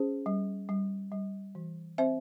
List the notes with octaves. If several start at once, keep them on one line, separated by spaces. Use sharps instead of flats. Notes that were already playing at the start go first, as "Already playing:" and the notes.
Already playing: C#4 G#4 C5
G3
G3
G3
E3
C4 C5 E5